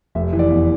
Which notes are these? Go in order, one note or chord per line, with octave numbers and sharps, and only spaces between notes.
F1 E5
E3
D5
E2